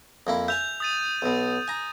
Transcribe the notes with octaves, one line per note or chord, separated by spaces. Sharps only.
F2 A#3 E4
E5 G#5 G6 F7
D#6 A6 D#7
B1 B2
G#5 A#5